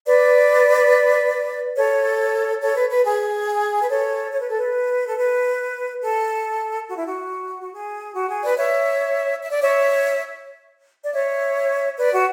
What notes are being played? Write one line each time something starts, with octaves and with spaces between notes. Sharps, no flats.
B4 D5
A4 C#5
A4 C#5
B4
B4
G#4
B4
A4 C#5
C#5
B4
A4
B4
A4
B4
A4
F#4
E4
F#4
F#4
G#4
F#4
G#4
B4 D5
C#5 E5
E5
D5
C#5 E5
D5
C#5 E5
B4 D5
F#4